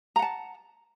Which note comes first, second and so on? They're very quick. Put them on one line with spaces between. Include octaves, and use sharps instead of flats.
A#5 F#5 A5